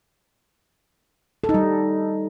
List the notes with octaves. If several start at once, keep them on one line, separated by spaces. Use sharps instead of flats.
A4
D#4
G3